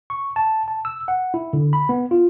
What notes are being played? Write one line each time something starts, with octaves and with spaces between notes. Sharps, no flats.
C#6
A5
A5
E6
F#5
E4
D3
B5
B3
F4